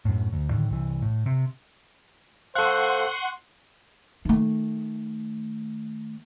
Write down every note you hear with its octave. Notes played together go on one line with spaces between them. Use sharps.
F#2 A2
D2
A2 D3 D#3
C2 E3
A2
C3
A4 C5 F5 F#5 C6 C#6 F#6
D#3 A3